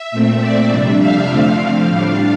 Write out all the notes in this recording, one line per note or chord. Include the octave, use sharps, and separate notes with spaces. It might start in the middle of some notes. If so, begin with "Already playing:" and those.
Already playing: E5
A#2 A3 C4
D5
F2 C3 G3 D4 E5
F5
D3 F3 A3 C4
F5
A2 G3 D4